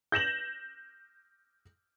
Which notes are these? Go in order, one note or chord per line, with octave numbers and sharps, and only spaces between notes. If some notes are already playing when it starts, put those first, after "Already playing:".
G6 A#6 E7 F#7